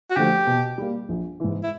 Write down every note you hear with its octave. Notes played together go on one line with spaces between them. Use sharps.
F#4
D3 F3 A3 G4
B2
G3 A#3
A#1
G#2 E3
E4